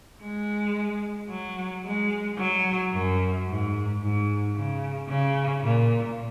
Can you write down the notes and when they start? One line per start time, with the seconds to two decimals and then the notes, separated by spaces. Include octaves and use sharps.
0.22 G#3
1.30 F#3
1.85 G#3
2.38 F#3
2.92 F#2
3.47 G#2
4.01 G#2
4.55 C#3
5.09 C#3
5.64 A#2